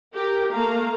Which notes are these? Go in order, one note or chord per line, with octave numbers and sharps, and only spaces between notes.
G4 A#4
A3 A#3 F5 A#5